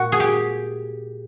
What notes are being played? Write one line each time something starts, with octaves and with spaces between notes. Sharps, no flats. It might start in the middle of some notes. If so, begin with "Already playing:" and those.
Already playing: A#2 F#4
G#4
G4